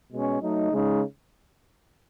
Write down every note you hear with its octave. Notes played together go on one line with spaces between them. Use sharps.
B2 G#3 C#4
F#3 A3 D#4
C#3 G#3 D#4